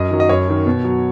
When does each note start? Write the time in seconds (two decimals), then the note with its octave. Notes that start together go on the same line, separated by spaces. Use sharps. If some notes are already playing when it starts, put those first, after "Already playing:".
Already playing: F#2 D#5
0.11 D#3 F#3
0.20 D#5
0.29 F#2 C#5
0.48 D#3 F#3
0.66 B2
0.85 F#3